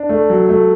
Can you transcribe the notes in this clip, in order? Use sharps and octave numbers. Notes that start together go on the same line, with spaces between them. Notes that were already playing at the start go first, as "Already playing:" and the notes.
Already playing: D4
A3
F#3
A3